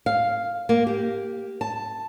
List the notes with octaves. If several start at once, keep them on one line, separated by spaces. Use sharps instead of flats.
F5
A#3
G4
A5